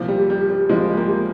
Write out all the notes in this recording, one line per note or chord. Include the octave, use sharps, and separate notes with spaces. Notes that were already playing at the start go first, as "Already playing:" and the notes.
Already playing: C2 A#2 F3
G3
G3
G3
C2 A#2 F3 G#3
G3 A#3